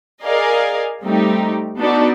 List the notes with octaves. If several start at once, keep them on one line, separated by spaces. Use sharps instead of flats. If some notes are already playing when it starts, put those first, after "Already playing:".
G#4 A#4 D5 D#5 F5 G#5
G3 A3 C4 D#4 G4
B3 D4 D#4 F#4 A4 D5